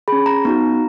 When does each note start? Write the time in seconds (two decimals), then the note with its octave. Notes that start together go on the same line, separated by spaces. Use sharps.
0.08 C#4 G#4 B5
0.26 A#5
0.45 B3 D#4 F#4